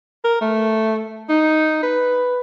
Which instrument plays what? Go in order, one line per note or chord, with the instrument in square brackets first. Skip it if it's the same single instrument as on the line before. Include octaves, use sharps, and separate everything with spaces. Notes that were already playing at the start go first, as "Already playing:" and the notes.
[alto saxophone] A#4
A3
D#4
B4